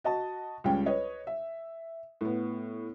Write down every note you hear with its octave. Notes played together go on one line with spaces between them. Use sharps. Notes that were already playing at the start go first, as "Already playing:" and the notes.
F#4 D#5 A5
C#2 G3 C#4 G5
B4 C#5 D#5
E5
A2 B3